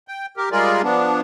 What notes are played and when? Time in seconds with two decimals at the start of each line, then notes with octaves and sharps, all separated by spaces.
0.08 G5
0.37 G4 A#4
0.52 G3 G#3 F4 G#4 A#4 D5
0.83 F3 B3 D4